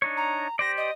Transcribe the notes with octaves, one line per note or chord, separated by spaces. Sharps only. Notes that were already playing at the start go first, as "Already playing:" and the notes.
D4 D#4 C#5
A#5
G4 C5 D5 A#6
D#5